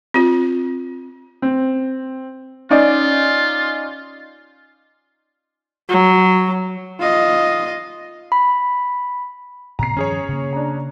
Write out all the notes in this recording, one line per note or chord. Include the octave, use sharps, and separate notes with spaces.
C4 F4
C4
C#4 D#4 F4 D5
F#3
F4 D#5
B5
A2 C3 B3 A#5 C7
G2 D#3 F3 C#4 G#4 C#5
C#3 A#3
D4 A#5